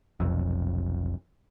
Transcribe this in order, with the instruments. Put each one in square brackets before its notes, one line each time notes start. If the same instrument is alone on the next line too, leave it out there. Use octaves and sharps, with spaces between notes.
[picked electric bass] F1 B1 F2